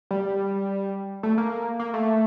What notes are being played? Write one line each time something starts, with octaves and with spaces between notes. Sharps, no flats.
G3
A3
A#3
A#3
A3